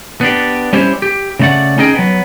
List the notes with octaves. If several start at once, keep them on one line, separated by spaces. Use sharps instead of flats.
B3 D4 G4
G3 C#4 E4 G4 C5 C#5
G4
C#3 A3 A#4 D5 F#5
C#4 D#4 G#4 D#5 G5
F#3 B3